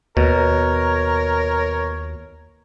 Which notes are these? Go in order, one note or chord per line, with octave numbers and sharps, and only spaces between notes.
D#2 B2 A#4 C#5